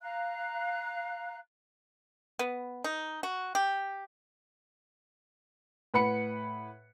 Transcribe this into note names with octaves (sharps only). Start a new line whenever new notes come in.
F5 A#5 F#6
B3
D#4
F#4
G4
A2 B4 F#5 B5 C#7